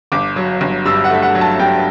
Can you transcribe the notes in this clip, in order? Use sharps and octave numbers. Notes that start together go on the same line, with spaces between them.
G1 D6
F#3
G1
G2 E6
F#5
A3 E5
F#5
F#3
A5
G2 G5